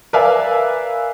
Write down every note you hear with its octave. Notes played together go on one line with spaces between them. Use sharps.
A#4 B4 D5 E5 F5 G#5